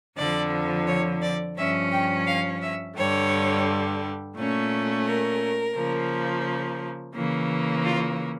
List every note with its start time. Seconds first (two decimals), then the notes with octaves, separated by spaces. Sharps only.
0.17 F2 D3 F3 D5
0.87 C#5
1.22 D5
1.57 G2 F3 C#4 E5
1.92 G5
2.27 F5
2.62 E5
2.96 G2 D3 G3 C#5
4.36 A#2 A3 C#4
5.05 A#4
5.76 C#3 F3 A#3
7.15 C#3 E3 A#3
7.85 F4